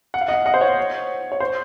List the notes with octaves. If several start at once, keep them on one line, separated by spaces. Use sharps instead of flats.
F#5
F5
D#5 F#5
D#5 F#5
C5
C#5
C#5
C5